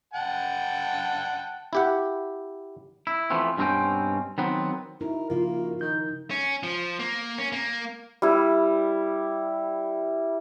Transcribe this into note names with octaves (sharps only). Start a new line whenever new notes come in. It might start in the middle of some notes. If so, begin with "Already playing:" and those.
F#5 G5 A5
E4 G4 F#5
E4
E3 F3 A3 B3 C4
G2 B2 D#3 C4 C#4 G5
D#3 F#3 B3 C4
D#4 E4 F#4 A#4
C#3 F3 A#3 F4
D#3 D#4 G6
C#4
F3
A#3
C#4
A#3
G3 E4